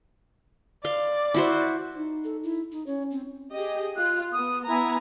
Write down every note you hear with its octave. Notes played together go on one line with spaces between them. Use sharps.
D5 F5 C6
E4 F#4 C5
D#4
A4
E4
D#4
C#4 C#5
C4
G4 G#4 D#5
F4 F#6
B3 D#6
B3 E4 G#5 A#5